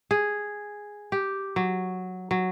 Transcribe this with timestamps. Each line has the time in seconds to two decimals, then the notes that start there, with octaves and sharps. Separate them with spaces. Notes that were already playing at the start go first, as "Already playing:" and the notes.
0.11 G#4
1.12 G4
1.56 F#3
2.31 F#3